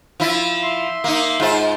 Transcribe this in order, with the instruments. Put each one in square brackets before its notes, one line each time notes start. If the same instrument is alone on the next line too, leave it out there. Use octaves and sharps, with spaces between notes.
[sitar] F3 E4
[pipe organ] E5 C6
[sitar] A#3 D#4
G#2 F4 C5